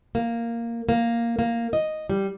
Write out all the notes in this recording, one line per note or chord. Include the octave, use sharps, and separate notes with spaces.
A#3
A#3
A#3
D#5
G3